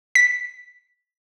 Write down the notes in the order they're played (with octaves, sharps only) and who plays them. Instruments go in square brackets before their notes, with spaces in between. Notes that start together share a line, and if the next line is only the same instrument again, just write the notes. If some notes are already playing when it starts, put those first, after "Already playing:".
[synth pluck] B6